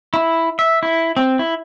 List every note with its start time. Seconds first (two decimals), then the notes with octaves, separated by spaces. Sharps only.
0.14 E4
0.59 E5
0.83 E4
1.17 C4
1.39 E4